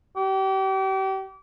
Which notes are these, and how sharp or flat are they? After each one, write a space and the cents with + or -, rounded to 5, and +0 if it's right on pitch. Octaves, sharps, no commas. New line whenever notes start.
G4 -35